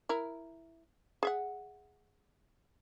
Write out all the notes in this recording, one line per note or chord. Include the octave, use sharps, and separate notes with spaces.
E4 A#4
G#4 E5 F#5